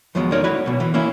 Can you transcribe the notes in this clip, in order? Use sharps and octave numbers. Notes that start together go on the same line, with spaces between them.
D#2 F3 F#3 G#3 B3
D#4 A#4 C#5 D5
E4 F#4 B4 C#5
B1 B2
E3
A#3 C#4 E4